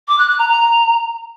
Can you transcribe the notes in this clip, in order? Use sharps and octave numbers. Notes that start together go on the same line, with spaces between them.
D6
F#6
F#6
A#5
A#5